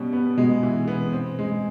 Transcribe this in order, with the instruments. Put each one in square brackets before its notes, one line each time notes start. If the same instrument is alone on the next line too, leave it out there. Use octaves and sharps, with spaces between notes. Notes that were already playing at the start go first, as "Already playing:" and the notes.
Already playing: [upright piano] B2 G3 C#4
B3
[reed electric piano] B2 [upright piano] G#3
[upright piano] E3
B3
C4
G#3